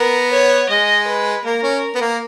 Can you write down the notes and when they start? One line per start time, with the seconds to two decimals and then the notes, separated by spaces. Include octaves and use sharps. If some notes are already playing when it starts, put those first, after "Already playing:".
Already playing: B3 A#4
0.32 C#5
0.69 G#3 D#5
1.07 B4
1.45 A#3 A#4
1.63 C#4
1.95 B3
2.01 A#3